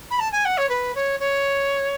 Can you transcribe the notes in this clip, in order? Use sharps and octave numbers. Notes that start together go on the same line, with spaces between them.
B5
A5
G#5
F#5
C#5
B4
C#5
C#5